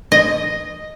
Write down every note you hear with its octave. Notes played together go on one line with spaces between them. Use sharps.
D#5